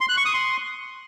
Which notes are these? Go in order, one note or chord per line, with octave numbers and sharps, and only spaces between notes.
C6
F#6
C#6
D#6
C6